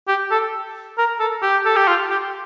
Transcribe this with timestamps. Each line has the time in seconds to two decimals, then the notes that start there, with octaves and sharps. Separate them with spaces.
0.08 G4
0.31 A4
0.98 A#4
1.20 A4
1.42 G4
1.66 A4
1.76 G4
1.88 F4
2.10 G4